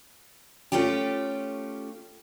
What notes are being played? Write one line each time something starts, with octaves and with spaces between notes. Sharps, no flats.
A3 C#4 F4 G4